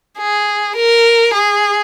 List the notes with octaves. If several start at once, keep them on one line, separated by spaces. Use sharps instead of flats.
G#4
A#4
G#4